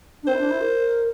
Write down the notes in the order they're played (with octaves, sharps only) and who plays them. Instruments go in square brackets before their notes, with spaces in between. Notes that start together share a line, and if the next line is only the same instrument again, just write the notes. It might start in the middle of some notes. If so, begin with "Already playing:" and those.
[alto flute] D4
[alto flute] C4 [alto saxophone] C5
[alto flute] E4
D4
E4
A#4